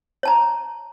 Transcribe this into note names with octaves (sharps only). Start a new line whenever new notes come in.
C#5 A5 A#5